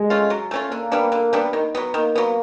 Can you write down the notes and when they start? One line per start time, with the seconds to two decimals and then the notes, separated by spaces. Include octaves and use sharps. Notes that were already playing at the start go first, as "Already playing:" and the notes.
Already playing: G#3
0.10 A3 C#4 F4
0.30 F#3
0.51 A3 C#4 F4
0.71 D3 A#3
0.92 G3 B3 D4
1.12 D3
1.33 G3 B3 D4
1.53 D#3
1.75 F#3 B3
1.94 D#3 A#3
2.15 F#3 B3